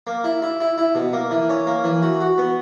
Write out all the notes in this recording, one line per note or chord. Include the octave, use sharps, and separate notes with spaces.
A#3
E4
E4
E4
E4
B2
A#3
E3
C#4
A#3
E3
F#4
F#4
B3